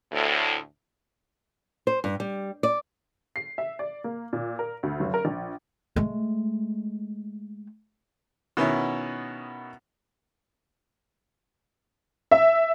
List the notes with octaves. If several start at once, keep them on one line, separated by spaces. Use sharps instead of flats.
D2 A2
C5
G2
G3
D5
C7
E5
D5
A#3
A#2
A#4
D2
F#1
A#4
A#1
G#3 A3
B2 D#3 B3 C#4 E4
E5